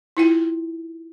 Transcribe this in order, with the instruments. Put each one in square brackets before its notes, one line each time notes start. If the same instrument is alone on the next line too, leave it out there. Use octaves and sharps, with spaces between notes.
[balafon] E4 F4 G5